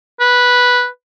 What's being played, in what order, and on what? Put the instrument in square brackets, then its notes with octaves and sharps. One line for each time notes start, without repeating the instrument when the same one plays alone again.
[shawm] B4